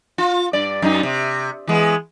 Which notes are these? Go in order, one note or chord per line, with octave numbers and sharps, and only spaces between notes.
F4
G2 D5
F#2 D#4
C3
E3 G#3 B3